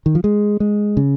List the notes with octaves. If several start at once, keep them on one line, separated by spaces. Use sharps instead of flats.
D#3
F3
G#3
G#3
C#3